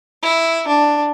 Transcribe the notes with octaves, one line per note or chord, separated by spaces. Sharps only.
E4
D4